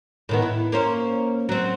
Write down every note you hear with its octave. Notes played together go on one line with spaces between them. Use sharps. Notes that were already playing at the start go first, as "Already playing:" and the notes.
A2 D#3 B3
E4
A#3 C#4 C5
F#3 C4